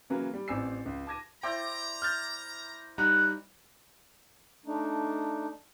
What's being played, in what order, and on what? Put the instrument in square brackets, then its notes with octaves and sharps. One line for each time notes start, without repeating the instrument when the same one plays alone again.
[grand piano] C#3 E3 F#3 A#3 A#5
G3
A1 C4 D5 G#5 E6 C7
C#2
A5 D6 G#6 A#6 D#7
[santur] E4 C5 D5 [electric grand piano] G5 [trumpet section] A#5
[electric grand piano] F6 G6 A6
[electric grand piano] G3 D#4 A#5 [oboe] F#5
[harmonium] A3 D4 D#4